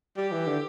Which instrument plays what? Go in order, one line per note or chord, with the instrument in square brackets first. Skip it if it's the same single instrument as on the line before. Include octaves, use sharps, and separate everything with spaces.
[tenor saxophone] G3 [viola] G4
[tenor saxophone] E3
D3